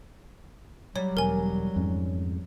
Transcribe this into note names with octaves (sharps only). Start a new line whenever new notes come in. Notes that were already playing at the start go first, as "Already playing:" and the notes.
F#3 G3 C#5
E1 A#4 G#5
F2 G#2 C#4